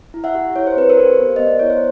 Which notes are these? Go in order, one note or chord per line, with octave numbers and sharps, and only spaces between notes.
E4
E5 F#5
G4
E4 C#5
C5
C4 B4
A#4 C5
G4
B3
B3 D#5
D5
E4 C#5
C5